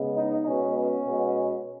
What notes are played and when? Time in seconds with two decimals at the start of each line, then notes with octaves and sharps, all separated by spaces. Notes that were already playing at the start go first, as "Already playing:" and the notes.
Already playing: C#3 G#3 B3
0.17 D#4
0.47 B2 G#3 B3 C#4
0.77 C#4
1.06 B2 G#3 B3